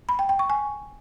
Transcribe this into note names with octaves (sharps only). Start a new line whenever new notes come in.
B5
G5
G5
C#6
G#5